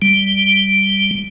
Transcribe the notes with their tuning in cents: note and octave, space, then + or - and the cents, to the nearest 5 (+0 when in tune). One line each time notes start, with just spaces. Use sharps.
G3 +0